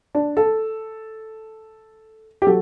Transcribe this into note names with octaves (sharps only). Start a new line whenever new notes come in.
D4
A4
G4
F#3 A4